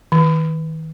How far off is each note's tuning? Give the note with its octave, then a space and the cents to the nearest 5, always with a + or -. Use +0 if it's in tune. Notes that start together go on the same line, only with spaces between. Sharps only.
D#3 +35